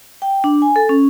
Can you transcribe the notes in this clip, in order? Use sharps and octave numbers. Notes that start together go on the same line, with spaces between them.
G5
D4
G#5
A4
C#4